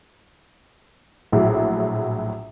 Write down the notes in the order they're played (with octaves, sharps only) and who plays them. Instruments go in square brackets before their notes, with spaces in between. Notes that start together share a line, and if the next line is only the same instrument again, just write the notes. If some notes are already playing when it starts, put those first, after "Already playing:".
[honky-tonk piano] A#1 A2 F#3 G#4